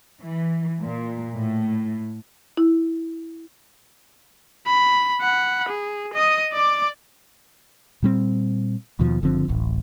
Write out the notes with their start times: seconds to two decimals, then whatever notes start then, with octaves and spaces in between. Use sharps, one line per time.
0.20 E3
0.81 A#2
1.34 A2
2.57 E4
4.66 B5
5.21 F#5 B5
5.68 G#4
6.14 D#5 D#6
6.53 D5 D6
8.02 A#2 G3 C4
8.99 D#2 B2 F3
9.22 F#1 D3 F3 C4
9.48 D1 A1